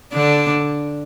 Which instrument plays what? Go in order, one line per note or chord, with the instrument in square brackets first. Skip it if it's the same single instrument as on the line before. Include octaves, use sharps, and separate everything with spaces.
[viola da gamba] D3 D4